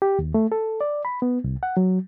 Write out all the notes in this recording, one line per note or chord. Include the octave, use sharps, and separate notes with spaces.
G4
D#2
A3
A4
D5
B5
B3
C2
F#5
F#3